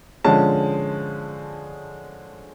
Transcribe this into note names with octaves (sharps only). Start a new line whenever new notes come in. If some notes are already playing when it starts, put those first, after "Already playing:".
D3 F3 G#3 C#4 A5